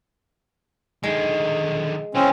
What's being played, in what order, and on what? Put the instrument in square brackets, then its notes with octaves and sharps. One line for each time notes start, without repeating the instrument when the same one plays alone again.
[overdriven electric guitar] D3 D#3 [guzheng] G#3
[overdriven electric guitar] E3 A#3 [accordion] C4 C#4